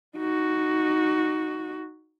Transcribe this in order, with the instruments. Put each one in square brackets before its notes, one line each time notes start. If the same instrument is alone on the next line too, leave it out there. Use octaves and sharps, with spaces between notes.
[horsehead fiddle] D#4 F#4